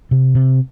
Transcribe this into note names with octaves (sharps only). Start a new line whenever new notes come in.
C3
C3